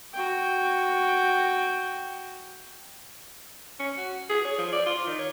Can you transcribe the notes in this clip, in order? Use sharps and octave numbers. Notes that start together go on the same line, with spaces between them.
F#4 G5
C#4
F#4
G#4
C#5
F3
D5
F4
D#3
C#5